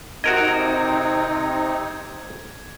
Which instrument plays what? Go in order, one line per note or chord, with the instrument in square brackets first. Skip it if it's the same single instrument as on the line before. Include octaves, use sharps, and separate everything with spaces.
[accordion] C3 C4 D#4 [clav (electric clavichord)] F#4 A#4 D#5 [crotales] G#6